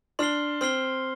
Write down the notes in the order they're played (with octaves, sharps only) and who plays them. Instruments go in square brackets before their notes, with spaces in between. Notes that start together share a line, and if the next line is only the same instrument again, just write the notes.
[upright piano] D4 [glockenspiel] C6 F6 C7 G7
[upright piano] C4 [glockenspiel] C6 F6 C7 G7